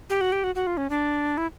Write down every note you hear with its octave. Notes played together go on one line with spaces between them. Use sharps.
G4
F#4
G4
F#4
F#4
F4
C#4
D4
E4